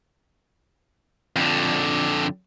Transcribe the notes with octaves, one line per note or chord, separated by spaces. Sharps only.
F2 D3